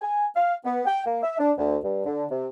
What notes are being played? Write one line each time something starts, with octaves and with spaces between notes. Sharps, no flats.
G#5
F5
B3
G5
A#3
E5
D4
D2
G2
D3
C3